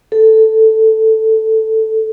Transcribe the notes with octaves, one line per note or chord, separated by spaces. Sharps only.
A4